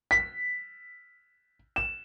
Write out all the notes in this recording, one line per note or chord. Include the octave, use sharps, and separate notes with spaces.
B6
E7